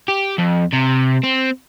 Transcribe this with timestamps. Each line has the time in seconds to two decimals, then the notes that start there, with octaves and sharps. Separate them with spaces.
0.08 G4
0.39 F2
0.73 C3
1.24 C4